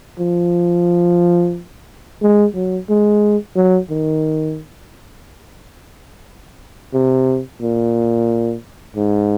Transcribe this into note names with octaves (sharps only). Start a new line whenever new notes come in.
F3
G#3
F#3
G#3
F#3
D#3
C3
A#2
G#2